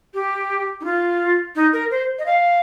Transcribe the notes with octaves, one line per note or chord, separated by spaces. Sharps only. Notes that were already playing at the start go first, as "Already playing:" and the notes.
G4
D#4
F4
D#4
A#4
C5
D#5
F5